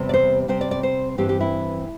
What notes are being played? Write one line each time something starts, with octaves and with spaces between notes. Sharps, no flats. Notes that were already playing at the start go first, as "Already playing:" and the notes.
Already playing: E2 C3 G3 C4
D5
C5
C3 G3 C4 C5
D5
D5
C5
G2 E3 C4 G4
G4
E4